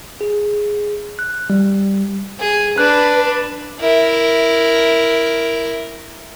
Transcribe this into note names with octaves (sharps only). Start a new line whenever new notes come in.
G#4
F#6
G3
G#4
D4 B4 F#6
E4 A#4